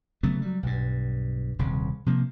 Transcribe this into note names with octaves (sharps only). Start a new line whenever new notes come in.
C#3 F#3 A3 B3
F#3 G3
B1 G2
D#1 C2 C#3
C3 F3 A#3